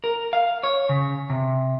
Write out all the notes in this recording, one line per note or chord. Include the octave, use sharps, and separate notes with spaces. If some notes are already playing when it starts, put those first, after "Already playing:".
A#4
F5
C#5
C#3
C3